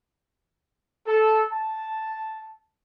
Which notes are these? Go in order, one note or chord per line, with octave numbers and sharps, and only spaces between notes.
A4
A5